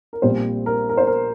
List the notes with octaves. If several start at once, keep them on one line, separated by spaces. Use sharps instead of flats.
A#4
A#1 A#2 G3 C4 C5
A#4
A#4
C5
A#4